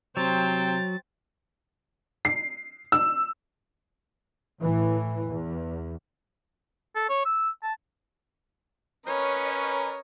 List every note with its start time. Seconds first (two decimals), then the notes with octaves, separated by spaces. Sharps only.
0.17 C3 F#3 C5 G5 A6
2.25 C7
2.92 E6
4.61 A2 E3
5.29 E2
6.95 A4
7.09 C#5
7.25 E6
7.63 A5
9.06 C#4 A#4 B4 C#5 D#5